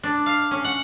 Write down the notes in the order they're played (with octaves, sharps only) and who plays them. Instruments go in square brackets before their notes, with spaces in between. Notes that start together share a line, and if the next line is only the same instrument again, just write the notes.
[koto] D4
F5
C#4
F#5